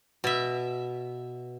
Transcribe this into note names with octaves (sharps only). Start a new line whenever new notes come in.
B2 E5